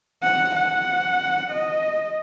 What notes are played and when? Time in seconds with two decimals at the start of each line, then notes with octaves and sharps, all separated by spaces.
0.23 F#5
0.56 F#5
1.51 D#5